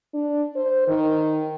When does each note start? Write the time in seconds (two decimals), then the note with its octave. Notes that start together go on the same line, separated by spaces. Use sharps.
0.14 D4
0.56 C5
0.88 D#3